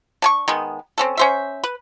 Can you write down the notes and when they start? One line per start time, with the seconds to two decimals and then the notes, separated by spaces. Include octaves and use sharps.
0.22 D4 G#5 C#6
0.48 D#3 G#3 B3
0.98 C4 C#4 A4
1.17 C#4 C5 E5
1.64 B4